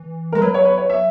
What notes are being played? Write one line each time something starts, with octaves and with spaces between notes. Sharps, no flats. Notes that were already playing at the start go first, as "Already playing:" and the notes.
Already playing: E3
G#3 A#4
F#3 B4
C#5
B4
C#5
E5